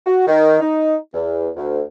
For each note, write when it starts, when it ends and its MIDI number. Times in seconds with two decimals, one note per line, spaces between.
0.07 0.26 66
0.27 0.57 51
0.60 0.95 63
1.14 1.48 40
1.56 1.81 38